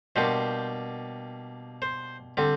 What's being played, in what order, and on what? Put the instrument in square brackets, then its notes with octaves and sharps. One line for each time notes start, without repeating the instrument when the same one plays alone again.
[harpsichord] B2 G3 A#3 D4 C5
C5
D3 G3 C4